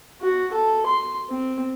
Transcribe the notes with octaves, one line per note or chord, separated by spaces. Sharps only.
F#4
A4
C6
C4